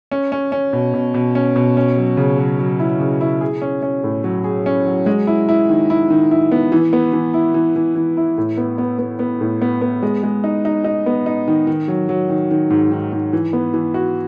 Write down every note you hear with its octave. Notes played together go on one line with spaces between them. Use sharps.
C#4
C#4
C#4
B2
B2
B2
C#4
B2
C#4
F#3
C#3
F#3
F#3
E4
C#3
E4
G#4
C#4
C#4
A2
F#3
G#4
C#4
F#3
G#3
E4
E4
D#3
E4
D#3
E4
B3
E3
B3
E3
E4
E3
E3
E3
E4
A2
B3
B3
B3
B3
A2
B3
B3
G#3
G#3
D#4
D#4
D#4
B3
D#4
D#3
D#3
F#3
F#3
D#3
D#3
G#2
D#3
G#2
E3
B3
E3
F#4